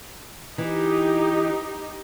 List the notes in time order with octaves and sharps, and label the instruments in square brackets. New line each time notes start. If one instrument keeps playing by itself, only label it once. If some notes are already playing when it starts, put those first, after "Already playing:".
[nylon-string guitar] E3 [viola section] D#4 G4